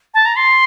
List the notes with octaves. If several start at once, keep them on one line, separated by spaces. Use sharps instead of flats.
A5
A#5
C6